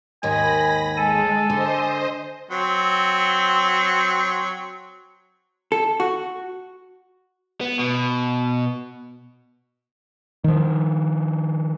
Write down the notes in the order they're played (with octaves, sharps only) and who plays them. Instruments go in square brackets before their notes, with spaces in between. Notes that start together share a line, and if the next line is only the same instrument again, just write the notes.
[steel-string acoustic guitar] D#2 G#2 D#3 [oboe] G#5 [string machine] B5 A#6
[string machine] G#3 [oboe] A4 [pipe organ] G#5
[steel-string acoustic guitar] D3 [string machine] C5 D#5
[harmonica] F#3 C4
[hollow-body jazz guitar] A4
F#4
[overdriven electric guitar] B3
B2
[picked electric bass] D#3 F3